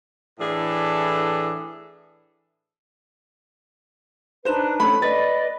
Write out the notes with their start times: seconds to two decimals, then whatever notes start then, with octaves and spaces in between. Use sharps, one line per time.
0.40 A2 E3 D4 G#4 A4
4.45 D4 D#4 B4 C5 E7
4.80 A3 C#4 B5
5.02 B4 D5 D#5 A6